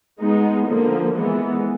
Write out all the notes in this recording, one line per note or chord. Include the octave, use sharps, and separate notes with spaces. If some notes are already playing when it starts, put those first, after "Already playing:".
G#3 B3 D#4
D3 F3 A#3
E3 G#3 B3